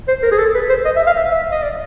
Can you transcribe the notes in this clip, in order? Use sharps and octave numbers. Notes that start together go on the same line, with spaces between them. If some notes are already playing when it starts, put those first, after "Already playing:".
C5
A#4
G#4
A4
B4
C5
D#5
E5
F5
E5
E5
D#5
D5